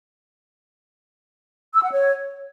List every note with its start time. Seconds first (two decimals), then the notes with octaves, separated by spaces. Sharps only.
1.74 E6
1.83 F#5
1.92 C#5